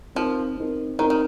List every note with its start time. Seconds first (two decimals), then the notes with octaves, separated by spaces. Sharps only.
0.15 F3 C4 D#4 A#4
0.57 C4 D#4 A#4
0.99 D#3 C4 D#4 A#4
1.10 D#3